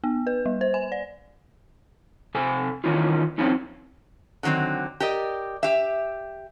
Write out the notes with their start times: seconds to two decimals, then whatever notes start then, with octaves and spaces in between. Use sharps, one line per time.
0.04 B3
0.27 B4
0.46 G3
0.61 C5
0.74 G#5
0.92 D5
2.35 C3 A4 G#5
2.84 D#3 E3 C#4 D#4 F4
3.38 F3 C4 C#4 D#4
4.43 D3 D#3 F#3 B3 C4
5.00 G4 A#4 D5 D#5
5.63 G4 E5